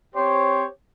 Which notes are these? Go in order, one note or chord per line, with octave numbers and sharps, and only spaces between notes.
C4 G4 C5 C#5